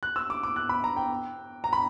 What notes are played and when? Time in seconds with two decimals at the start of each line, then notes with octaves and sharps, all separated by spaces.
0.03 F#6
0.16 E6
0.30 D6
0.43 D6
0.56 F#6
0.69 B5
0.84 A#5
0.96 G5
1.64 A#5
1.73 B5